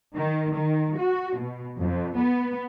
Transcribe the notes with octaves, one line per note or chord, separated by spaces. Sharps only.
D#3
D#3
F#4
B2
F2
B3